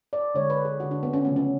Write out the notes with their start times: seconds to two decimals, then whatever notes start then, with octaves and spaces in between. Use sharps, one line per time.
0.13 D5
0.34 D3 G#3 C#5
0.50 B4
0.65 G#4
0.80 D3 G#3 F#4
0.91 D4
1.03 B3
1.13 C#4
1.25 C#3 F3 A3 B3
1.36 C#4